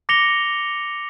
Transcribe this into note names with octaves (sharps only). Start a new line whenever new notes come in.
D6 A#6 C#7 F7 G7